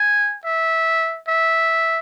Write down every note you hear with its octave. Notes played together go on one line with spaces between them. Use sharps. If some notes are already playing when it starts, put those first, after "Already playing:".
Already playing: G#5
E5
E5